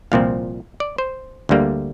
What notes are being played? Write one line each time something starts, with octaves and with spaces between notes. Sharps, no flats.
C2 A#2 F3 C4 F5
D5
C5
D2 D3 G3 A#3